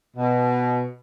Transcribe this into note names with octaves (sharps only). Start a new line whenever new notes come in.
B2